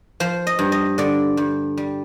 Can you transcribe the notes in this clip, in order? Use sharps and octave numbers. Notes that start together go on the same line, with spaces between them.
F3 C5
D#5
G2
D#5
D3 D5
G2
G3